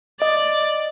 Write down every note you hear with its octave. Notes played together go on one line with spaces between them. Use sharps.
D5 D#5